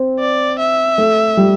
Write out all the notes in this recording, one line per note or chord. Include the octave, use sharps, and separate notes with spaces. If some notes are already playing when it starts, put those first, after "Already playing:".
Already playing: C4
D5
E5
A3
G3